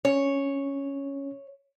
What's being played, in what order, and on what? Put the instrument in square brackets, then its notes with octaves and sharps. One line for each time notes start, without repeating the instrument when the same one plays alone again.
[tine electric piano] C#4 [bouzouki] C#5